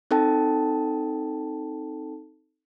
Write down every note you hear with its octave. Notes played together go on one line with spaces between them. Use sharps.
C4 D#4 A4 G5 A5